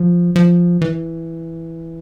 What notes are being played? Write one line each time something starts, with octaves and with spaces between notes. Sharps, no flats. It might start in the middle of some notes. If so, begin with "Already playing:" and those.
Already playing: F3
F3
E3